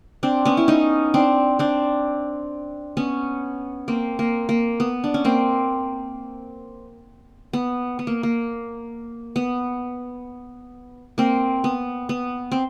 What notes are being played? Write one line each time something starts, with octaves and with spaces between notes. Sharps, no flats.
C4 D4
B3 C#4
E4
C#4 D#4
C4 D4
C4 D4
B3 C#4
A#3 C4
A#3
A#3
B3
D4
C#4
A#3 C4
B3
B3
A#3
A#3
B3
A#3 C4
B3
B3
C4